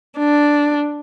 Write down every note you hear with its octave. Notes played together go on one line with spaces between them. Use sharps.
D4